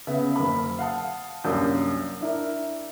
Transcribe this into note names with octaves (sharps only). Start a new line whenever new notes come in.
C#3 B3 E5
F#1 A#4 B5
F5 F#5 A5 D#6
C2 F#2 A#3 D4 D#6 G6
D4 E4 A#4